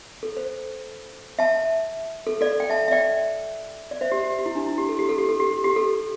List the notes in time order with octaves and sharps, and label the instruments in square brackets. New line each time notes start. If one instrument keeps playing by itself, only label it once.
[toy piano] A4
C5
E5 A5
A4
A4 D5
G5
E5 A5
E5
D5 G5
D5
C5 E5
G4
G4
G4
E4
D4
E4
G4
A4
G4
A4
G4
A4
G4
G4
A4